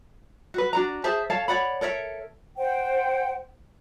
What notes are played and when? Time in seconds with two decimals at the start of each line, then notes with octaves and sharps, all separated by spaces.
0.54 F#4 B4
0.73 D4 F#4 A#5
1.04 G#4 C5 E5 A5
1.30 A4 C#5 F5 A5
1.48 C#5 D5 F#5 B5
1.81 A4 A#4 C#5 E5
2.57 C5 F#5 G5